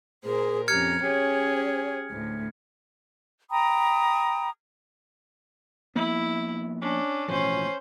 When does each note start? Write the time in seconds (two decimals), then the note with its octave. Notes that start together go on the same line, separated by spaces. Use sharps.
0.24 A#2 G#4 A#4 C5
0.68 F2 C#4 G4 A#5 F6 G#6 C#7
1.01 C#4 G4 G#4 C#5
2.10 D2 A2
3.50 G5 A#5 B5 D#6
5.96 F3 A#3 B3 E4
6.82 C#4 D4
7.28 A1 B2 F3 C#4 C5